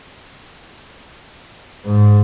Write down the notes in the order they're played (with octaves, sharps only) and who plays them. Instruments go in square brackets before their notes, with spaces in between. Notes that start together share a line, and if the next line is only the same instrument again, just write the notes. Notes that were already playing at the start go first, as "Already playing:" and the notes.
[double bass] G#2